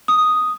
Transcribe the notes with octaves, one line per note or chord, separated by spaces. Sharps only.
D#6